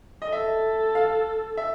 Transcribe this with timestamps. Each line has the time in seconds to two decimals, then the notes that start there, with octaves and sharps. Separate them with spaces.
0.22 D#5
0.32 A4 E5
0.95 F5
1.57 E5